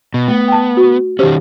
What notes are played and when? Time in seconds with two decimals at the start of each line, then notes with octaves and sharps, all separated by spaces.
0.14 B2
0.28 A3 B3
0.48 G5 A5
0.77 F#4
1.19 D#3 C#4 G4 C5